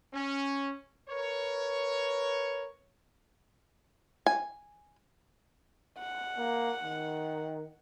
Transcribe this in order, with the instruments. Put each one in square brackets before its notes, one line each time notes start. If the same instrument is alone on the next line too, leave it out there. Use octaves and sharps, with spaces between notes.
[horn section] C#4
A#4 B4 C#5
[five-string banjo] G#5
[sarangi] F#5
[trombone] A#3
D#3